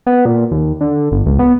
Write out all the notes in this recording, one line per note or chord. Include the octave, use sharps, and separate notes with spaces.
B3
A#2
D#2
D3
G1
C#2
B3